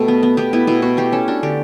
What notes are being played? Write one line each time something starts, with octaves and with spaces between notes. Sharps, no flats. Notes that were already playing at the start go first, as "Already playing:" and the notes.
Already playing: B2 A3 G4 A4
B3
B3
B3 G4
B3 E4
B2 E4
B2 F#4
A3 G4
C#4 A4
D4 F#4
D3 G4